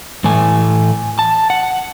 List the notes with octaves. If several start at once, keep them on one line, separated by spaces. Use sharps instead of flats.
A2 E3 A3 G#5
A5
F#5